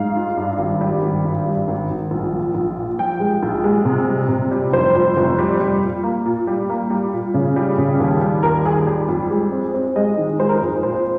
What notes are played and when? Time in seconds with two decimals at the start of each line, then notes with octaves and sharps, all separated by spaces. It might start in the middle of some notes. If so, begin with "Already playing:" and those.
Already playing: G#2 F5
0.16 F4
0.37 G2
0.58 G#1
0.81 G3
1.02 G#1
1.24 G2
1.46 G3
1.68 G#1
1.90 G#1
2.11 A#1
2.33 F3
2.55 A#1
2.77 A#2
2.99 F3 G5
3.20 G#3
3.43 A#1
3.64 G#3
3.85 C3
4.08 G3
4.29 C3
4.51 G3
4.73 F1 C5
4.95 F2
5.17 F1
5.38 G3
5.60 G3
5.82 A#2
6.03 A#3
6.25 A#2
6.47 G3
6.70 A#3
6.90 G3
7.13 A#2
7.34 C#3
7.56 G3
7.78 C#3
8.00 D#2
8.21 G3
8.43 D#2 A#4
8.65 D#2 G#4
8.87 G3
9.09 F2
9.30 G#3
9.52 C4
9.74 C4
9.96 G#3 D#5
10.18 D#3
10.40 G#3 C5
10.49 A#4
10.58 C5
10.61 F2
10.83 A#2 C5